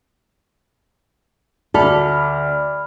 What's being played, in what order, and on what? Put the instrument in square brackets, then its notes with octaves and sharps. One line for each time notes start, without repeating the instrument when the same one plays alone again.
[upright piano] D2 [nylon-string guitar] A4 [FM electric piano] D5 B5 F6